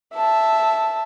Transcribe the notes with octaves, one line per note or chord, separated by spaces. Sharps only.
E5 A5